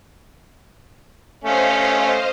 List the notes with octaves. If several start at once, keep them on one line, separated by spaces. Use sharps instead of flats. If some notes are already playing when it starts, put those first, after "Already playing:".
A3 C#4 C5 D#5 F5